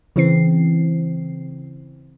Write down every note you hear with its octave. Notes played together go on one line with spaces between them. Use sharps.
C#3 E3 C4 C7